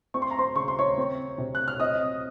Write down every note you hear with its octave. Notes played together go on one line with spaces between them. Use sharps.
C4 C#6
C6
A#5
C5 C6
C#3 C#6
C6
C#5 C#6
C4
C3
F#6
F6
C4 D#5 D#6